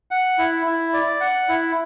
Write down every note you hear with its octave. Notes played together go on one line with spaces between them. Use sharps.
F#5
E4
E4
D5
F#5
E4